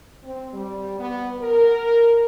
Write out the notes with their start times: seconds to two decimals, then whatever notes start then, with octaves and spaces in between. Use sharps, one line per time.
0.24 C4
0.53 G3
0.99 B3
1.40 A#4